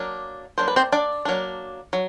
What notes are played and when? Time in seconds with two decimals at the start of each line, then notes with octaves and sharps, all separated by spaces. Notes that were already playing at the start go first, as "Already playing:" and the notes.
Already playing: F#3 A#3 D4
0.58 F#3 A#3 D4 C5
0.68 B4
0.76 C4 C5
0.92 D4 D5
1.25 F#3 A#3 D4
1.93 F#3